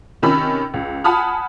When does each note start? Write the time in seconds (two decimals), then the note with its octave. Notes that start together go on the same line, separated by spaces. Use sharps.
0.22 C3 D#3 C#4 B5 E6
0.74 C#2
1.04 F#5 G#5 A5 B5 D#6 F6